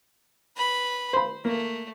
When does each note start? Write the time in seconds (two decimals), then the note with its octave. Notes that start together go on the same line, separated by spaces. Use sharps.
0.57 B4 B5
1.13 C5 B5
1.45 A3 A#3